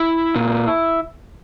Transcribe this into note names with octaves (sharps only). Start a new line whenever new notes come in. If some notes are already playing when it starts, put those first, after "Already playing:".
Already playing: E4
A#2